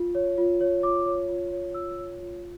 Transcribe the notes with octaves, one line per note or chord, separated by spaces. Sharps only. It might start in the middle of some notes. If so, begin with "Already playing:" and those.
Already playing: F4
C#5
F4
C#5
F4 D6
C#5
F4
C#5
F4 E6
C#5
F4